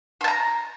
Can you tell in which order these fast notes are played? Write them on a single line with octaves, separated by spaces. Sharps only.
C6 A5 A#5